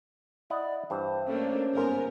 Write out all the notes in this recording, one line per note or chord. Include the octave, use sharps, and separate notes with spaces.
E4 D5 D#5 F#5
G2 E3 C5
A3 A#3 C#4 D4
G1 G#2 B3 A#4